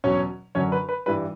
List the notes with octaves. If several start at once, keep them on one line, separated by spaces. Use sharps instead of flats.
E2 B2 F#3 C#4 C#5
F#2 D3 F#3 C#4 C#5
B4
B4
G2 E3 G3 B4